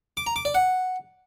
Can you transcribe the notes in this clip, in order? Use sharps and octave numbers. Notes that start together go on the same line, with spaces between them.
D6
A#5
D6
D5
F#5